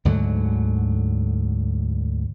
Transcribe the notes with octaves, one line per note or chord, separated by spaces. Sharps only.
D2 G#2 D3 F#3